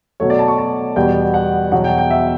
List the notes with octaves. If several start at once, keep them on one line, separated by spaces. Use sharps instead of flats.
B2 F#3 A3 C#5
D5
A5
C#6
A5
E2 B2 G3 B3 G5
F#5
E2 B2 F#3 F#5
G5
G5
E5